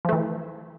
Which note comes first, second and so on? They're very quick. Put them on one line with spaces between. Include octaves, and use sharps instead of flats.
F3 A3 E3